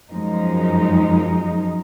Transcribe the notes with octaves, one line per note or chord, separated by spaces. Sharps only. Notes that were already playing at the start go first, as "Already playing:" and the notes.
F#2 F3 G#3 D#4